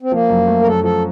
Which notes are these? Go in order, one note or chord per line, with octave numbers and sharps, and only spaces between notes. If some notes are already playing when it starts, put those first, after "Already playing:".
C4
F3 A#3
F#2
A3
A#4
F#2 A4
F3 A4